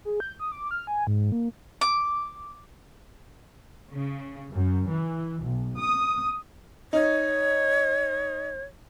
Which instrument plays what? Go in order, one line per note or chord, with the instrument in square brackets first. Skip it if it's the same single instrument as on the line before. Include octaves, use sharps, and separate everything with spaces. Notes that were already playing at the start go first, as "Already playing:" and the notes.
[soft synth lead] G#4
G6
D#6
D6
F6
G#5
G#2
A#3
[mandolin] D6
[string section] C#3
F#2
E3
B1
D#6
[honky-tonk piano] D#4 [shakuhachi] C#5